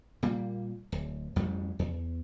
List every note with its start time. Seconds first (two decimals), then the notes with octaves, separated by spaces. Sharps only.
0.23 A#2 G3 A#3
0.92 D1
1.36 A1 F2 G#2 G3
1.79 E2